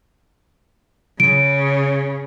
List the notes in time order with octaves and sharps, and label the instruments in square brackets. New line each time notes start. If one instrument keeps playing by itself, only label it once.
[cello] C#3 [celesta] D7